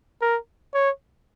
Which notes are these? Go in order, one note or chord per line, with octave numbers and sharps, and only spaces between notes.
A#4
C#5